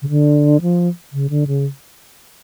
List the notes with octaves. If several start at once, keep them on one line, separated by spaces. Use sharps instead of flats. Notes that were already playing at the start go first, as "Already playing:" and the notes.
C#3
D3
F3
C#3
D3
C#3